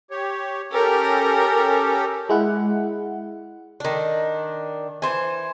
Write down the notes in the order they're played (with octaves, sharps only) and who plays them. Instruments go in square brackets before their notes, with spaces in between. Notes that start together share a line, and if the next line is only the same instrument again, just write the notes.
[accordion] G4 C#5
[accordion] C#4 G4 A4 [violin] A#4
[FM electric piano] G#3 E4 F#5
[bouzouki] D#3 D4
E3 C5 G#5